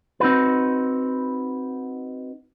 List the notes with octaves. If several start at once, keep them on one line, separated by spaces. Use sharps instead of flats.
C4 D#4 F#4 B4